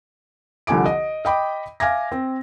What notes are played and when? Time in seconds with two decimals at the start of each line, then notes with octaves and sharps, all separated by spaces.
0.67 C2 D3 F3 G#5 D6 D7
0.86 D#5
1.25 D#5 G5 B5 D6
1.80 E5 F5 G#5 D6 G#6 A#6
2.12 C4